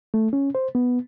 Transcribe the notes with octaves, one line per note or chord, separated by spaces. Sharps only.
A3
C#4
C5
B3